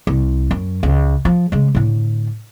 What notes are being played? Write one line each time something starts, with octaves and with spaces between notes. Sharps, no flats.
C2
F#2
C#2
F3
C#3 G#3
A2 D3